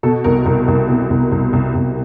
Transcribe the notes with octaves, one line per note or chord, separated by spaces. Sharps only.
B2 A4
C2 A#4
C2 A#4
C2 A#4
B2
C2
C2
C2
C2